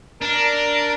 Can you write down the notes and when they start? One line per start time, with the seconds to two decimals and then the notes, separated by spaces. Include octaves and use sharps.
0.21 D4 A#4